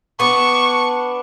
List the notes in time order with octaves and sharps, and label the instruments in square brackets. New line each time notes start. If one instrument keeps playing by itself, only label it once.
[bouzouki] B3 D4 [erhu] C#6